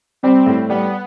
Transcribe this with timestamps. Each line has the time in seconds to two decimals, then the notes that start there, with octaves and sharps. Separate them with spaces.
0.23 G3 C4
0.46 A2
0.69 G3 B3